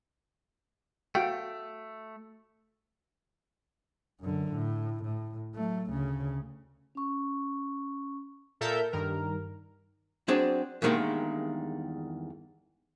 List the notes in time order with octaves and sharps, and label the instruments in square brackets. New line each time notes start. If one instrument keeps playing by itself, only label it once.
[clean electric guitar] A3 [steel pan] F#4 F5 G5
[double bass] F#2 D3
A2
A2
F#3 A3
D2 C#3
[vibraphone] C#4 C#6
[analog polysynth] A#2 A4 A#4 E5 G6
G2 D#3 A#4
[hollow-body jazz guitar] F#3 C4 D4 G#4 C5 D5
E2 G2 D#3 G#3 A#3 G5